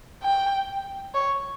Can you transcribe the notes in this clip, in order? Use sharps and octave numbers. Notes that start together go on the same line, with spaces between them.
G5
C#5